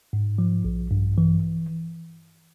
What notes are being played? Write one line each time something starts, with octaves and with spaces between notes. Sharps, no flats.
G#2
F3
A#1
G2
E3